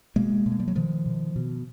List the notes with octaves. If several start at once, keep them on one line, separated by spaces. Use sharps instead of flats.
B2 G#3 A#3
B2
G#3
G3
F#3
B2 D#3 F3
B2
B2